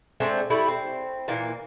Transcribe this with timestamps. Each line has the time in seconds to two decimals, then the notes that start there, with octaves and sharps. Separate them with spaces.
0.20 G#3 A3 C4 D4
0.50 G3 A3 E4
0.68 C4
1.28 A#2 E3 A#3